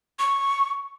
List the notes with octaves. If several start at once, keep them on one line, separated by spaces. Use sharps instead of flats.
C#6